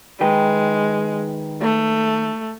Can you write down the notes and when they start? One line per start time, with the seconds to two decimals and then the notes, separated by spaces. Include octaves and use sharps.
0.21 D#3 G#3 B4 G5
1.62 A3